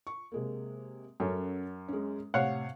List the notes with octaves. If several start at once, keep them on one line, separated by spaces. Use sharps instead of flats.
C#6
C3 G#3 A#3
F#2 C#4 A4 C#5
G#3 C#4
A2 C3 C#5 F5 F#5